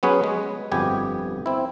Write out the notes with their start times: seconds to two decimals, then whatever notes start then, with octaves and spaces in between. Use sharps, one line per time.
0.03 F#3 B3 C#4 G#4 B4
0.24 G#3
0.72 G1 F2 B2 B3 G4 G#5
1.46 C4 E4